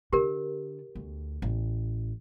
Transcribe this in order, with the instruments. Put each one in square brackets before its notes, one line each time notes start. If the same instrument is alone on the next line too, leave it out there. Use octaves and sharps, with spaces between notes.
[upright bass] D3 [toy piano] G4 A#4
[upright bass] D2
A1